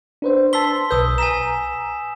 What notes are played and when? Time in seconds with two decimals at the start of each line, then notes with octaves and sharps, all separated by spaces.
0.22 D4 B4 C5
0.53 A5 C6 E6 B6 G7
0.91 B1 B4 D#6 E6 G6
1.18 G#5 A#5 B6 E7